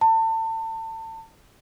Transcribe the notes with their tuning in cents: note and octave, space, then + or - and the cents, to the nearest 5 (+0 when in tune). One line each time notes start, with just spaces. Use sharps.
A5 +30